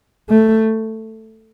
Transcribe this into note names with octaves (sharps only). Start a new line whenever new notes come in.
A3